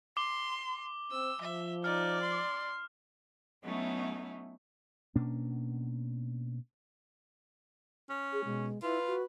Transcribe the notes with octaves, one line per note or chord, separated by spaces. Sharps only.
C6 D6 G7
C4 E6
F3 E5
D#4 D5 F6
C6
F#3 A3 B3 C#4 D#4 E4
B2 A#3 C#4 D4
C#4
G#4
B2 G#3
E4 F4 B4
F#4